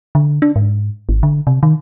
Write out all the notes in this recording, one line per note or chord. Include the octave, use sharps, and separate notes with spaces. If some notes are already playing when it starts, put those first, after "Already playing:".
D3
D4
G#2
G#1
D3
C3
D#3